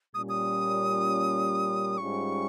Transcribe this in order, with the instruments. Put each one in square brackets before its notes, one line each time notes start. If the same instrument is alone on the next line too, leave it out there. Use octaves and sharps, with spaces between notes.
[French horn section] A#2 G3 C#4 [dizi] D#6
[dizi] D#6
[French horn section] G#2 G3 C#4 F4 [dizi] C#6